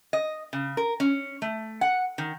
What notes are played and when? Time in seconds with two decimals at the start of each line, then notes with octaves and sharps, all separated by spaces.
0.13 D#5
0.53 C#3
0.77 A#4
1.00 C#4
1.42 A3
1.81 F#5
2.18 D#3